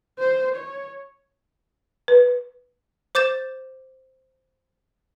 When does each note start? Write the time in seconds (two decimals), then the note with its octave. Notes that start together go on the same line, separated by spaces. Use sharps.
0.19 C5
0.56 C#5
2.08 B4
3.15 C5 D6 G6 A6 E7